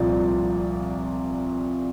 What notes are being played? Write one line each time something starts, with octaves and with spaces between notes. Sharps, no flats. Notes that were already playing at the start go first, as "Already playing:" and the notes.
Already playing: C2 A#2 F3 D5